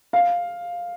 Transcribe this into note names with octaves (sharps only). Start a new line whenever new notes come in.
F5